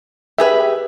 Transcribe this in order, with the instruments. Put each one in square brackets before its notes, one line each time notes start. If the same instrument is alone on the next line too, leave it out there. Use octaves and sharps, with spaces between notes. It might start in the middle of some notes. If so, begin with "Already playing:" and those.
[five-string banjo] G4 G#4 B4 [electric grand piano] E5